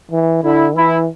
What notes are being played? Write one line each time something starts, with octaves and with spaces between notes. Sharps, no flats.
E3
D3 E4
E3 E4